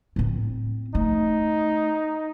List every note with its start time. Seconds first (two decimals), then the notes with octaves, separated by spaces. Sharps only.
0.16 A2 C4
0.95 A3 D#4